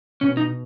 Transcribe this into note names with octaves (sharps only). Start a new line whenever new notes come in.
B2 C#4
D#4